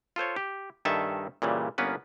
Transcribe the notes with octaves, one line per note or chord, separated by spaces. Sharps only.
F4 A4 C5 C#5
G4
G2 D#3 A4 E5 G#5 A5
A#2 C#3 E3 G3
G1 A#3 B3 C#4 B4